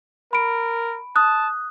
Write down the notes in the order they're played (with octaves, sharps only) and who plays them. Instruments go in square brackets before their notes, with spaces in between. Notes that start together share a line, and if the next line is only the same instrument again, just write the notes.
[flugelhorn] A#4 [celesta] B5 D7
[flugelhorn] A5 [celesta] D#6 F#6